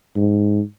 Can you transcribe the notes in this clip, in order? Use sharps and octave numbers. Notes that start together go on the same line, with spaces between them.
G#2